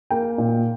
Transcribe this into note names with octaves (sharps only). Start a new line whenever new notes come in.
A#3 G5
A#2